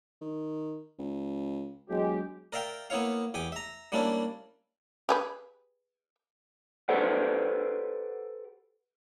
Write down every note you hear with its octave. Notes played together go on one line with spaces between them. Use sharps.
D#3
C#2
E1 F#3 G#3 G4
A#4 D5 E5 F5 G5
A#3 B3 E4 C#5 F5
E2 G4 G#5 D6
E5 A#5
G3 A#3 C#4 D4 E4
G4 G#4 B4
G4 A4 B4 C5 D5 F#5